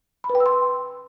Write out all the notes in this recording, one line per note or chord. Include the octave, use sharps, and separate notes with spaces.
B5
B4
G5
E6
C6